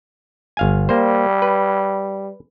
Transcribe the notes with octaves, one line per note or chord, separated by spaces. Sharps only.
G1 F5 G#5
G3 A#3 C5
B4